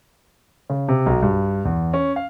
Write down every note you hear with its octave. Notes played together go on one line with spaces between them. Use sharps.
C#3
C3
B1
G2
E2
C#4
F5